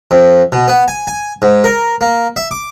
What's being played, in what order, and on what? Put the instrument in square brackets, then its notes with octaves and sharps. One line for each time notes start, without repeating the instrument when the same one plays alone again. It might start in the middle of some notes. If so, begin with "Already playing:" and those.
[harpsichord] F2
B2
B3
G#5
G#5
G#2
A#4
A#3
E5
D6